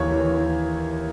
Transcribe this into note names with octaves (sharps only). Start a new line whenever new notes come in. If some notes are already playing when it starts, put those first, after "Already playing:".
Already playing: D#2 E3 C#5
E3
E3